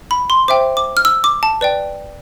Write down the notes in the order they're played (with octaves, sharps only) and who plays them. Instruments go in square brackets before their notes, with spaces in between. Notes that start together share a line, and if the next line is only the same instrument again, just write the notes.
[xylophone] B5
C6
C5 E5 G5 D6
D6
F6
E6
D6
A5
B4 D5 G5